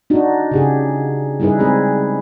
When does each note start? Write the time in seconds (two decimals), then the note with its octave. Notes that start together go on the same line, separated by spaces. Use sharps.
0.10 D4 D#4 F#4
0.51 C#3 G4 G#4
1.40 G3 D#4 E4 G#4 B4
1.59 G#3 C4 G#4